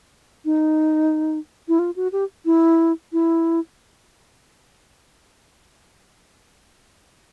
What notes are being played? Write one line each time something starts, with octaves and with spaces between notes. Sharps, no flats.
D#4
E4
F4
F#4
G4
E4
E4